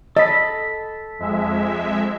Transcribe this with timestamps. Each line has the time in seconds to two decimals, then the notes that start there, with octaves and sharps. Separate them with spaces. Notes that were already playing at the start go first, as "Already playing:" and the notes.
0.17 A4 D#5 B5
1.19 F2 G#3 E5